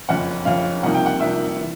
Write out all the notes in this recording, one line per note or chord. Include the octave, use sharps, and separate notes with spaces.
F#1 F2 C#3 F#5
F#1 F2 C#3 F5
C2 C3 F3 A#3 D#4 F#5
G5
F#5
C2 C3 F3 A#3 D#4 E5
E3